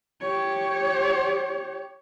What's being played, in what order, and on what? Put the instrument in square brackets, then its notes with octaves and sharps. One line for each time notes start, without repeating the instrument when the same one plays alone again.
[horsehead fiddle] G4 C#5